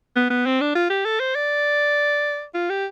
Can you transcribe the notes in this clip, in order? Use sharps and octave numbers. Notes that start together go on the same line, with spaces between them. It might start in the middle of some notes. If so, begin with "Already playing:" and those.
B3
B3
C4
D4
F4
G4
A4
C5
D5
F4
G4